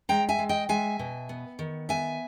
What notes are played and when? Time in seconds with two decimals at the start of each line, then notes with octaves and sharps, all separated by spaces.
0.09 G#3 G5 A#5
0.29 E5 G#5
0.39 G#3
0.49 D#5 G5
0.69 G#3 E5 G#5
0.99 B2
1.29 B3
1.59 D#3
1.89 B3 E5 G#5